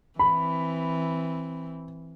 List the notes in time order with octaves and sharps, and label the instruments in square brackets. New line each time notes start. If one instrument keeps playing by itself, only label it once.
[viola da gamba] E3 C4 [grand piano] B5